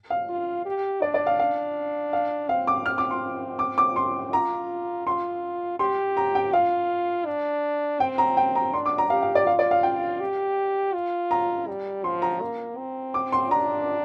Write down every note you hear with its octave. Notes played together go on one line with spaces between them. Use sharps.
F5
F4
G4
D4 D5
D5
F5
F5
F5
C4 F5
D6
C4 F6
D6
C6
D6
D6
C6
F4 A#5
F4 C6
G4 C6
A#5
G5
F4 F5
D4
C4 G5
A#5
G5
A#5
D4 C6
D6
A#5
G4 F5
F5
D5
F4 F5
D5
F5
G5
G4
F4
A#5
G3
F3 C6
A#5
A#3
C4
D6
C6
D4 A#5